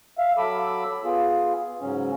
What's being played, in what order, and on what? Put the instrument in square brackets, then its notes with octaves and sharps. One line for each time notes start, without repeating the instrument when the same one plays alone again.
[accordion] E5 F5
F#3 A4 B5 D6 E6
B3 F4 G#4
G#2 C#3 F#3 C#4